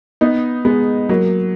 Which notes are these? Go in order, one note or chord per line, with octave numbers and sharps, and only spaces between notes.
B3 D#4
G#3 B3
F#3 A#3